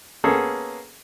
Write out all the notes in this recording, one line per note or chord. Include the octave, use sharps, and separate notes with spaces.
A#3 B3 C#4 G#4 A4